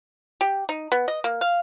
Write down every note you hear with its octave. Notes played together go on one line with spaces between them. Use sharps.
G4
D#4
B3
D#5
A#3
F5